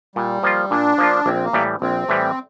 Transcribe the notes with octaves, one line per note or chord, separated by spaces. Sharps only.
A#2 G3
F3 A#3 F4
A#2 D4
F3 A#3 F4
A#1 C4
A#3
A2 E3 G3
A#1 C4
A2 E3 G3